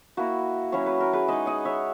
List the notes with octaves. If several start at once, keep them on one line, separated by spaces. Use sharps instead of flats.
A#3 E4 F#4 A#4
F#3 C#4 E4 C#5
B4
A#4
G#4 B4
G#3 D#4 B4 D#5
D#5 F#5
C#5 E5